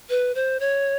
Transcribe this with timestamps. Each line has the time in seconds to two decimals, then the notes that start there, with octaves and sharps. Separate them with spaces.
0.10 B4
0.35 C5
0.60 C#5